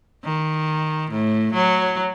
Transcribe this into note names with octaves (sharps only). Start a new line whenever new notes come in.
D#3
A2
F#3